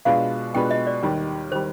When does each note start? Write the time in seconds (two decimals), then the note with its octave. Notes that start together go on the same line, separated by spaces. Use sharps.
0.05 B2 G#3 D4 F4 B4 F5
0.55 B2 G#3 D4 F4 B4 G5
0.71 D#5
0.87 D5
1.03 D#2 D#3 G3
1.52 D#3 G3 C5